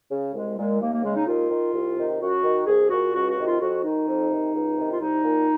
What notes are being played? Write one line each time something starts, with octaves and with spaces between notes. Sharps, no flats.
C#3
C2 G#3
A#2 G#3
D#2 A#3
A#3
C#3 G#3
D#4
D#2 F4
D#3
C2
C3 D#3
F#2 F#4
D#3
C2 G#4
A#2 F#4
C#2 F#4
F#4
C3 D#3
F4
F2 F#4
D#3 D#4
F2
C3 D#3
C#2
C3 D#3
F4
C2 D#4
A#2